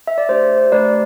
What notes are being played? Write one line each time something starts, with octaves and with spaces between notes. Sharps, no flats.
E5
D5
A3 D4 G4 C5
A3 D4 G4 B4 D5